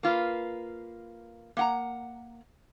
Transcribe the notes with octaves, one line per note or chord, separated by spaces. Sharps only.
A#3 F4 B4
A#3 F#5 A#5